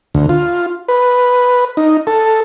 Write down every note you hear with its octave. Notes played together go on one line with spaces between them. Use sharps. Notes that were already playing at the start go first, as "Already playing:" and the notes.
D2
F4
B4
D#4
A4